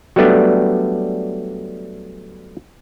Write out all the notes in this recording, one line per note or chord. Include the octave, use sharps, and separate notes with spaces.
F#3 G3 A3 B3 D4